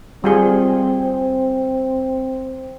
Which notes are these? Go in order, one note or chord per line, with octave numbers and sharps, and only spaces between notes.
G3 C4 F4 G#4